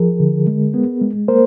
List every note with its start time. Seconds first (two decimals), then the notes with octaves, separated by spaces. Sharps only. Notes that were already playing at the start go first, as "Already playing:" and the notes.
Already playing: F3 G#4 A#4
0.20 D3
0.47 G#3
0.74 B3
1.02 G#3
1.28 A#3 A#4 C5